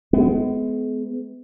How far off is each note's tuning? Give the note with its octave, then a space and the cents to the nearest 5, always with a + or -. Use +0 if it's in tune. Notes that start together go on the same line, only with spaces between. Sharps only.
G#3 +40 B3 +35